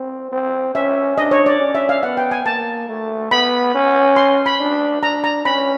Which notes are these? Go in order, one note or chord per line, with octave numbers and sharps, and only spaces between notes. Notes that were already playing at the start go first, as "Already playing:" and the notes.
Already playing: C4
C4
C#4 E5
D4 D#5
C#5
D5
C#4
E5
F5
B3 F#5
G5
G#5
A#3 A5
A3
B3 B5
C#4
C6
B5
D4
D4 A#5
A#5
C#4 B5